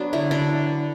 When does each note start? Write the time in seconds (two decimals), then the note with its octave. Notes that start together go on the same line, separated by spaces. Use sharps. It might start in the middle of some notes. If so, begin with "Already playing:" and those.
Already playing: F#3 B3 D4
0.13 D3 E4
0.31 D3 D4